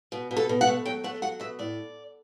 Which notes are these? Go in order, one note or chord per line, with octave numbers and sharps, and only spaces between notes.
B2
B2
A4
B2
F#5
A3
F#3 G5
A3 F#5
F#3 F#5
B2 E5
A2 D5